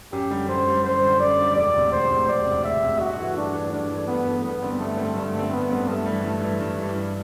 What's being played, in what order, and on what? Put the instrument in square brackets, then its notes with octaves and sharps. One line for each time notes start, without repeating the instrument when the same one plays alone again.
[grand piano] F#2 [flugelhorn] G4
[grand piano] D3 G3
[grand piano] F#2 [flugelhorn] C5
[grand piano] D3 G3
[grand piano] F#2 [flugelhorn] C5
[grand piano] D3 G3
[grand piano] F#2 [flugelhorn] D5
[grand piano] D3 G3
[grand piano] E1 [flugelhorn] D5
[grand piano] D2 C3
[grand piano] E1 [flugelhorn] C5
[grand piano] D2 C3
[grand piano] E1 [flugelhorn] D5
[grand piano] D2 C3
[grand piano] E1 [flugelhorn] E5
[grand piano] D2 C3
[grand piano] G2 [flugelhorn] F#4
[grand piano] E3 A3
[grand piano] G2 [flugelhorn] D4
[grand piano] E3 A3
[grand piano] G2 [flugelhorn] D4
[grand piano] E3 A3
[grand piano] G2 [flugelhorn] B3
[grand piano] E3 A3
[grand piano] G2 [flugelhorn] B3
[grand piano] D3 G3 C4
[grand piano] G2 [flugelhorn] A3
[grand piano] D3 G3 C4
[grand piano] G2 [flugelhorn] A3
[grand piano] D3 G3 C4
[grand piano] G2 [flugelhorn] B3
[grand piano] D3 G3 C4
[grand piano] G2 [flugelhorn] A3
[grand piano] E3 G3
G2
E3 G3
G2
E3 G3
G2